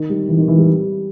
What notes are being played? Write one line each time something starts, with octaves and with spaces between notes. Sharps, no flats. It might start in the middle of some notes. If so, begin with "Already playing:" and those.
Already playing: D#3
G3
E3
D#3
E3
G3